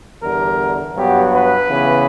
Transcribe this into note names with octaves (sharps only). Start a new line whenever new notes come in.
E2 D3 G3 A#4
G2 F#3 B3 G4
B4
C#3 E3 B3